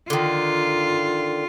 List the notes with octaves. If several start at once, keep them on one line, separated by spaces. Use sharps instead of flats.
D3 D#3 F4